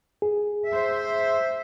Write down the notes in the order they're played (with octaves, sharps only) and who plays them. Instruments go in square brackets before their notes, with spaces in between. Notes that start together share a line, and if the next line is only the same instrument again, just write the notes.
[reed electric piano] G#4
[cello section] C5 E5